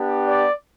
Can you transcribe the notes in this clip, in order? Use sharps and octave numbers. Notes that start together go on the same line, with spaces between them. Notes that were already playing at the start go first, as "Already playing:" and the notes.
Already playing: B3 D4 G4
D5